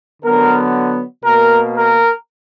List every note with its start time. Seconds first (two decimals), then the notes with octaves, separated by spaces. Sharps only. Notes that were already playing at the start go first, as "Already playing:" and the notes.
0.22 D3 F#3 B3 A#4
1.23 B2 A#3 A#4
1.75 A#4